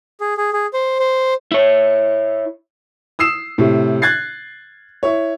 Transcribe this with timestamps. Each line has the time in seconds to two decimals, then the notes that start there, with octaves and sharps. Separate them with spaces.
0.21 G#4
0.37 G#4
0.53 G#4
0.74 C5
0.99 C5
1.52 E4 C#5
3.19 D#6 E6 C7 E7
3.58 A2 C3
4.02 F#6 G#6 A6 C7
5.03 E4 C#5